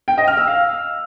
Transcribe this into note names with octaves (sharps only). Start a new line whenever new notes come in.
G5
D#5
F6
E6
F5